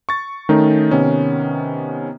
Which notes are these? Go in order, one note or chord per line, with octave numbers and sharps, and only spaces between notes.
C#6 A6
D#3 A3 C#4 D#4
C3 D#3 B3 C#4